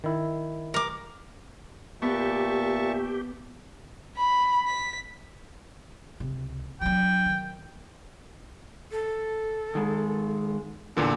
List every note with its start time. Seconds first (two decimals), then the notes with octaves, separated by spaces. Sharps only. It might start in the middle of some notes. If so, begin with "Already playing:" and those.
0.04 D#3 E4
0.74 A#4 D6
2.02 A#2 B3 G4 E5 A5 C#6
4.18 B5
4.67 B6
6.20 C#2 C3
6.81 F#3 D4 G5
7.26 D#3
8.92 A4
9.75 D#3 G#3
10.97 E2 A#2 D3 E3 A4 D5